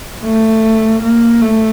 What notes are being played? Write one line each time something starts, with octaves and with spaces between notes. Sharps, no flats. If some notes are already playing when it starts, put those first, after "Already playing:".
A3
A#3
A3